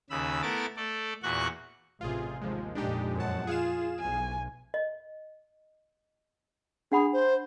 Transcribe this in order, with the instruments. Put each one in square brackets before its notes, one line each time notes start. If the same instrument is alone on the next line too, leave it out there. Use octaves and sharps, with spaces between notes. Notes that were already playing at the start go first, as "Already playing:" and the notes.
[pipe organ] D#2 C#3 B5 E6
A3 B3 E4 A#4 D6 A6
A3 A4 D5
E2 A#2 F#4 C#6 F#6
[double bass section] A1 C3 [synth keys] F4 G#4
[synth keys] D#2 F3 G#3
[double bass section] F2 A#2 G#3 [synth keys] D4 D#4 G4
[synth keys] F#2 A5 [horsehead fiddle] C#5 F#5
[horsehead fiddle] F4 [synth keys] G#4 F5 E7
[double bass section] B1 [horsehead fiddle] G#5
[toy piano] D#5
[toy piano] D4 F#5 B5 [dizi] G#4
[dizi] C5